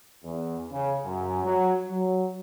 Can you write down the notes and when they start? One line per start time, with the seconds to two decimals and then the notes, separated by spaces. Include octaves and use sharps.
0.24 E2
0.72 C#3
1.04 F#2
1.43 F#3
1.89 F#3